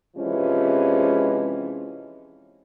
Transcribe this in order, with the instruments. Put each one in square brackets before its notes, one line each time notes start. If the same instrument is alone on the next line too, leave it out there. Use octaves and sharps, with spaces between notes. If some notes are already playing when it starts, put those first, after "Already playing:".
[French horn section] C3 E3 F3 G#3 C#4